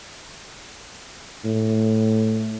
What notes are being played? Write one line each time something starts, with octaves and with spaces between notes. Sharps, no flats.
A2